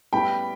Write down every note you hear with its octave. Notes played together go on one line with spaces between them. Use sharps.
A2 G3 B3 G5 B5